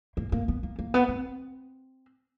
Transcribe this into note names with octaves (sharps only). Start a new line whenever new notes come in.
A#3
A#3
B3
A#3
A#3
B3
C4